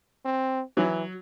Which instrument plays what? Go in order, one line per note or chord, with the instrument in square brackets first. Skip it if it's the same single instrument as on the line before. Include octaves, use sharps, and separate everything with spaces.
[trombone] C4
[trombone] E3 [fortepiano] F#3